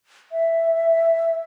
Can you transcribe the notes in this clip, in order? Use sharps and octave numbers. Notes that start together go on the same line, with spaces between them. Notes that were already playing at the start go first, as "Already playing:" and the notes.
E5